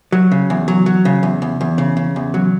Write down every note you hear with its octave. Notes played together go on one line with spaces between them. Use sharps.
F#3
C#3
E2
F#3
F#3
C#3
E2
E2
E2
C#3
C#3
E2
F#3